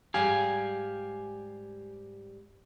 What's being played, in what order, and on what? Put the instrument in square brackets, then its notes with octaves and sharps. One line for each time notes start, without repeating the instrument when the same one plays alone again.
[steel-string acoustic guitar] G#2 G3 G5 [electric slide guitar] G4 F5 G#5